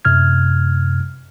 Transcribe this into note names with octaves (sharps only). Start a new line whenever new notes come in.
F#2 C3 F6 G#6